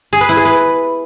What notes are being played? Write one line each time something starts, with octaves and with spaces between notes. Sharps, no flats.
G#4
B4
E4
G#4
B4